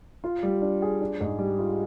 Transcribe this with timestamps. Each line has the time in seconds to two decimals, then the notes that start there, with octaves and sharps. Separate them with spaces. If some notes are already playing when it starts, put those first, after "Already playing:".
0.24 F4
0.43 G3
0.62 D4
0.82 G#4
1.01 D4
1.21 G#2
1.39 G3
1.59 F4